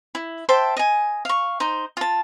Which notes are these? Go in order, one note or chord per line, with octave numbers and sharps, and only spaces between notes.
E4
C5 E5 G5 A5
D#5 G#5
F5 C#6
D#4 C5
F4 A5